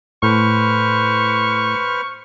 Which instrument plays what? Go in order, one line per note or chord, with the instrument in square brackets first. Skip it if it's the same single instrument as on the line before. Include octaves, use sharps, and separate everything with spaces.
[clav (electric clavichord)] A2 [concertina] B4 C5 F6 [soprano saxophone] C#6